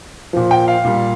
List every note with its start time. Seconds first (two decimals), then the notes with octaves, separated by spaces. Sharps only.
0.33 A#2 F3
0.51 G5
0.68 F5
0.85 A#2 G3